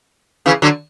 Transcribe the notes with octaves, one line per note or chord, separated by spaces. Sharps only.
C#3 E3
D3 F#3